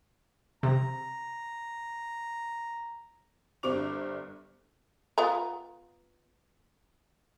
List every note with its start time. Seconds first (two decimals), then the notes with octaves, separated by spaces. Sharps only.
0.63 C3 A#5
3.63 G1 G2 G4 C5 D6 F7
5.18 B3 F4 A#5